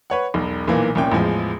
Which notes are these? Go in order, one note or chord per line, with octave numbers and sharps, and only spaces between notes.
B4 C#5 F#5
E1 B1
B1 A#2 E3 A#3
C2 A#2 C#4 G5
A1 E2 F3 G#3